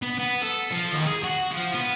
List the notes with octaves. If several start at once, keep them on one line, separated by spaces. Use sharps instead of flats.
B3
B3
A4
F3
D#2
G#4
F#4
F3
B3